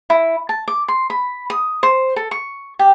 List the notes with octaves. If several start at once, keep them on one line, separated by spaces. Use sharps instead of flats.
E4
A5
D6
C6
B5
D#6
C5
A4
C#6
G4